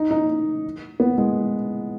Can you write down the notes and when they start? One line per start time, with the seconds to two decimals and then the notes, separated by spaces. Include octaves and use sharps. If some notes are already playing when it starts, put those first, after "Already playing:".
Already playing: D#4
0.11 D#4
1.00 B3
1.18 G#3